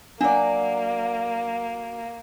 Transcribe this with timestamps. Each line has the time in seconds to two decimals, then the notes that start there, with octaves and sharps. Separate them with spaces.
0.21 F#3 A#3 D4 D5